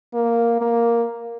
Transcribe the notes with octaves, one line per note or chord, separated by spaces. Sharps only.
A#3
A#3